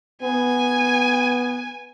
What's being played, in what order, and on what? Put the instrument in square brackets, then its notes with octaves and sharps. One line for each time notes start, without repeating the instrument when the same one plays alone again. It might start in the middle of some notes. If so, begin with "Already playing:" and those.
[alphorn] B3 [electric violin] G#5